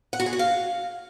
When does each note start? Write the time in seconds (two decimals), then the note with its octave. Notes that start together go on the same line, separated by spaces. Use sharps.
0.13 F#5
0.20 F#4
0.26 G#4
0.33 F#4
0.39 F5